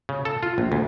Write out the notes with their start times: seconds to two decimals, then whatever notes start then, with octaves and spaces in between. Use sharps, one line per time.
0.09 C#3
0.25 A4
0.43 F4
0.58 A#1
0.72 D2